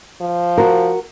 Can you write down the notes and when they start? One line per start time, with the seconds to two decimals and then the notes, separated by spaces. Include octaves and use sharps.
0.21 F3
0.57 F#4 A#4